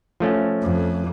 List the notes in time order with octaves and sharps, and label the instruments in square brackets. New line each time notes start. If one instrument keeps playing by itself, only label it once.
[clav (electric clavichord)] F3 A3 C#4
[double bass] F2